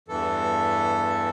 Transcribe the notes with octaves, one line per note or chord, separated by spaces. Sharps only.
E2 G2 E3 A4